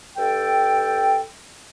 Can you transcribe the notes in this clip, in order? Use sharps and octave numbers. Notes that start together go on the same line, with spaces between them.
G2 A4 G5